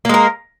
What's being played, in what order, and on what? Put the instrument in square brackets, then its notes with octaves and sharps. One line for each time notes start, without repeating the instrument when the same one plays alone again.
[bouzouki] A#3
G#3
A#4